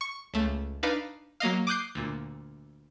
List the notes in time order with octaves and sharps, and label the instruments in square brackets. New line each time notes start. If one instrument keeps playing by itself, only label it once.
[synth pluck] C#6
C#2 A3
D4 D#4 B4 F5
F#3 A#3 D#5 F5
D6 D#6 F#6 G6 C7
D2 A#2